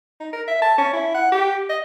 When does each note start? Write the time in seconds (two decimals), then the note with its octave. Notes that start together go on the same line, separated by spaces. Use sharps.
0.20 D#4
0.33 A#4
0.48 E5
0.62 A5
0.78 C#4
0.93 E4
1.15 F#5
1.32 G4
1.70 D#5